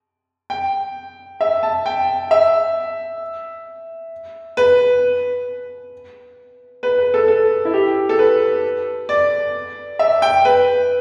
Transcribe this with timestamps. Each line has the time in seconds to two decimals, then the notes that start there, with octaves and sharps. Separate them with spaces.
0.50 G5
1.41 E5
1.63 A5
1.86 G5
2.31 E5
4.57 B4
6.83 B4
6.98 B4
7.14 A4
7.28 A4
7.65 E4
7.74 G4
8.09 A4
8.19 B4
9.09 D5
9.99 E5
10.22 G5
10.45 B4